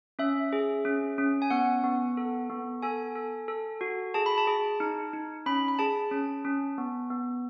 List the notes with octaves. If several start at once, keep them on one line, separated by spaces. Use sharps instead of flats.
C#4 E5
G#4
C#4
C#4
G#5
B3 F#5
B3
A4
B3
A4 G#5
A4
A4
F#4
G#4 A5
B5
A5
G#4
D#4
D#4
C#4 B5
B5
G#4 A5
C#4
C#4
B3
B3